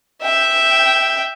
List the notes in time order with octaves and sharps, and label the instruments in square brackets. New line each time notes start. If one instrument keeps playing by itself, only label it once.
[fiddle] E5 G5